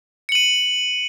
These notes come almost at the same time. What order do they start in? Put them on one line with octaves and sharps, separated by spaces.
C#7 F#7 D#7